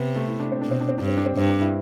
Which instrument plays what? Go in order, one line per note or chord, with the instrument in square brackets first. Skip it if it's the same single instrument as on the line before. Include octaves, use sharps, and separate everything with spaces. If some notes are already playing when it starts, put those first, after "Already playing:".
Already playing: [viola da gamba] C3 [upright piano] B3
[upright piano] A3
E4
D4
C4
[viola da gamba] B2 [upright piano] D4
[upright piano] C4
D4
C4
[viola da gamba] G2 [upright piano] D4
[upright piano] C4
D4
C4
[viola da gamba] G2 [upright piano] C4
[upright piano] D4
E4